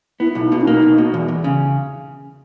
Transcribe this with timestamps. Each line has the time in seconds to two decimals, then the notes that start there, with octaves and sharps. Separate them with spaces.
0.20 B3 E4
0.32 B1 E4
0.44 D#4
0.52 B2 E4
0.61 C#4
0.67 A#3 D#4
0.82 B1
0.98 B2
1.14 E2
1.28 E2
1.44 C#3